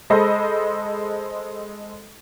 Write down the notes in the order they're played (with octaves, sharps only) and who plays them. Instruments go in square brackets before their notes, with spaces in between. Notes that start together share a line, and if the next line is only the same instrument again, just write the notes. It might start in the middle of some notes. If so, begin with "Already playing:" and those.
[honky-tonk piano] G#3 A4 C5 D#5 B5